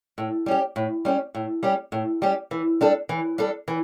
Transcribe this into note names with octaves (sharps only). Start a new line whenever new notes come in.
A2
G3 C#4 G4
A2
G3 C#4 G4
A2
G3 C#4 G4
A2
G3 C#4 G4
E3
G3 D4 A4
E3
G3 D4 A4
E3